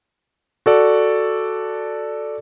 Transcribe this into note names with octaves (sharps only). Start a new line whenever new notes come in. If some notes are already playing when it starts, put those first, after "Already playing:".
F#4 A4 D5